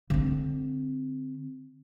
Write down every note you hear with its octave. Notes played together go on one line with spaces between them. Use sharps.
D3 C4